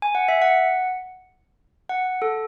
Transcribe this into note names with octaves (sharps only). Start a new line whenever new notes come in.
G#5
F#5
E5
F#5
F#5
A4